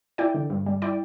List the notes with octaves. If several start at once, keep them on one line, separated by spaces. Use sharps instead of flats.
E4 D5 G5
D3
G2
G3
E4 D5 G5